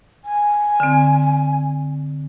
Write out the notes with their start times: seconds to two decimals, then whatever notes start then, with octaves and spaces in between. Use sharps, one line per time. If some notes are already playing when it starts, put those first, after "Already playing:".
0.25 G#5
0.80 D3 C4